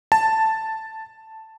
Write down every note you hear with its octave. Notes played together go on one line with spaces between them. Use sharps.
A5